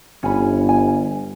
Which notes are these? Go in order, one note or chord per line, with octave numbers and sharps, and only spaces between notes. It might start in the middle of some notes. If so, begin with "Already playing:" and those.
G1 C#4 G#5 B5
G#5